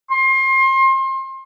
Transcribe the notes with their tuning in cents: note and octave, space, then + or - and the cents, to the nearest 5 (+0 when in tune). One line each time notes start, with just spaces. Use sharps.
C6 +30